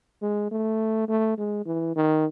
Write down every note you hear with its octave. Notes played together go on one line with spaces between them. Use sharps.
G#3
A3
A3
G#3
E3
D#3